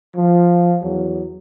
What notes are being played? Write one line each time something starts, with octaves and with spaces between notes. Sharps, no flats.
F3
E2 F#3